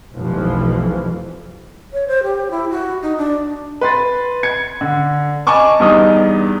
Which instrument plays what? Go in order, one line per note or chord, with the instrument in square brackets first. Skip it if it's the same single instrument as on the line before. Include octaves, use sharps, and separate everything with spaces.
[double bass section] F1 B1 E3 F3
[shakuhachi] C#5
C5
G4
E4
F#4
D#4
D4
[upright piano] B4 C6 A6
G#6 C#7
D3
D#5 G#5 A5 C#6 D6
E2 G2 D4 D#4 D#6